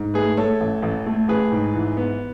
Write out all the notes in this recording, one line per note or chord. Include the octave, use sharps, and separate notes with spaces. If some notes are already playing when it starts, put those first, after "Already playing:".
Already playing: G#2
A3 G#4 B4
A3 A4 C#5
A1
A1
A3
A1 G#4 B4
G#2
E3
B3